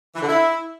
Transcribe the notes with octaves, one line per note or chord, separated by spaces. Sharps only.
E3
D3
E4